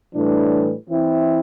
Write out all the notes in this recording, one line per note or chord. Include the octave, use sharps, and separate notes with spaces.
A2 E3 G3 D4
E3 C4 E4